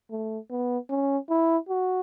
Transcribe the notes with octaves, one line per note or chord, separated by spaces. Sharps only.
A3
B3
C#4
E4
F#4